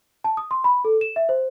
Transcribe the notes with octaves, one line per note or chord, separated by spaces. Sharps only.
A5
D#6
C6
B5
A4
E7
E5
C5